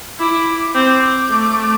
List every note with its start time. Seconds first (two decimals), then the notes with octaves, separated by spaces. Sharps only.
0.19 E4 D6
0.74 C4 D6
1.30 A3